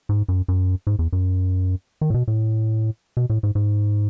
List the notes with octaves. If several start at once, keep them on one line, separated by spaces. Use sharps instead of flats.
G#2
F#2
F#2
G#2
E2
F#2
D#3
A2
B2
A2
B2
A2
G#2
G#2